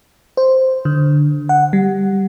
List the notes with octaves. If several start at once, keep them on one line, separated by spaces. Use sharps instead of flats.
C5
D3
F#5
G3